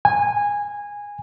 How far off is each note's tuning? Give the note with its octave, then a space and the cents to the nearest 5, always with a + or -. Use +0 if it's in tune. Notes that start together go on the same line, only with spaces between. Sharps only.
G#5 -15